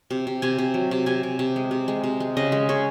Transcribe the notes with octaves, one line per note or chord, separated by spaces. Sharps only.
C3
C3
C3 G#5
C3
F#3
C3
C3 G#5
C3
C3
G#3
C3
G#3
C3
G#3
C#3 D#5
G#3
C#3 C#5